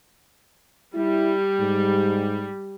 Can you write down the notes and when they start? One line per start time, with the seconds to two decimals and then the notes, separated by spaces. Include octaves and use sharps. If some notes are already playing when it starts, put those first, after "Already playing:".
0.95 G3 E4
1.60 G#2